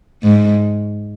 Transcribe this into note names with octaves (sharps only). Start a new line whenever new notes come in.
G#2